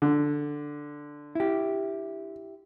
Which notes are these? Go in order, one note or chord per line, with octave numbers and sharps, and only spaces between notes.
D3
E4 G4